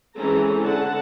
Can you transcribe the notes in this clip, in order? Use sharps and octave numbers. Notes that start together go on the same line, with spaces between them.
E3 G#3 C4 C#4 A4 A#5
D3 F#5 A5